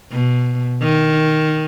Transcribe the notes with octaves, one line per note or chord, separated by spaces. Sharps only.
B2
D#3